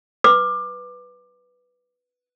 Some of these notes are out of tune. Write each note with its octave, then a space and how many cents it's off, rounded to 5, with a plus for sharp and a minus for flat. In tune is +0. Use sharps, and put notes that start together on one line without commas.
B4 +0 D6 +20